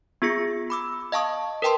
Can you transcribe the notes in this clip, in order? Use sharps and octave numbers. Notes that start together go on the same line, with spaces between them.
B3 F4 G#4 A#6 C#7
B5 D6 E6
D#5 F5 A5 C#6 D#6
A#4 B4 G5 A5 C6